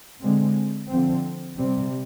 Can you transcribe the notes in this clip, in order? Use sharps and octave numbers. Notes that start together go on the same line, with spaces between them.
D3 G#3 C4
D3 F3 C4
C3 G3 C4